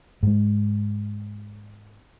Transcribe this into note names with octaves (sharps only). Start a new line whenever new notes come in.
G#2 G#3